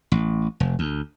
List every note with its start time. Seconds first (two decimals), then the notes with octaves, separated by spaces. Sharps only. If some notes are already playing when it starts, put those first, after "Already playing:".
0.12 A1
0.60 F1
0.79 D2